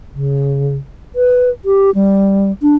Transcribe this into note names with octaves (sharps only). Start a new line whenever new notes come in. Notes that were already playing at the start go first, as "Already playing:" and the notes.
C#3
B4
G4
G3
D4